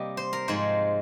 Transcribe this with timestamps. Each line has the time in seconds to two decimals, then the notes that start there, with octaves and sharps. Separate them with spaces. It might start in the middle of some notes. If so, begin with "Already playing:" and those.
Already playing: C3 G3 A#3 G4 D#5
0.17 C5
0.33 A#4
0.48 G#2 F3 G#3 C5